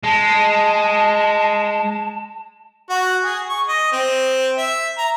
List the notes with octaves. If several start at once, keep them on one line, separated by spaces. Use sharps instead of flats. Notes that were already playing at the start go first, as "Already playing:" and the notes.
G#3 A5
F#4
G#4
C#6
D#5
C4
E5
A#5